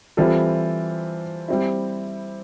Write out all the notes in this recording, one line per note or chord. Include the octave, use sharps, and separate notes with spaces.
E3 G3 C4 F4 A4
G3 C4 E4